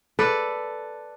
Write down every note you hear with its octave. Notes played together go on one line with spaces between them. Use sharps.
A4 B4 D5